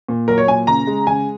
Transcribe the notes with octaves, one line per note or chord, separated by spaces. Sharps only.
A#2
F#3 A#4
C#5
A#2 G#5
C#3 A#5
G#3
C#3 G#5